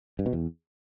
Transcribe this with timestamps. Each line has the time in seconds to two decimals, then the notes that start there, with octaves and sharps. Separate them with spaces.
0.19 G2
0.26 B2
0.33 E2